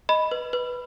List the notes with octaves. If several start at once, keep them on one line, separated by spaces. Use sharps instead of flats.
D#5 B5
B4
B4